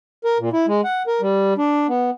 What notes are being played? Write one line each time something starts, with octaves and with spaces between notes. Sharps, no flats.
A#4
A#2
E4
G#3
F#5
A#4
G3
D4
B3